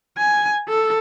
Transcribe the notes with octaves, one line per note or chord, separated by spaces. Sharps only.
G#5
A4